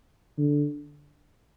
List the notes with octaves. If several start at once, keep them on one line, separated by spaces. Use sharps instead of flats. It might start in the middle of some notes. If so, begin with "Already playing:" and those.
D3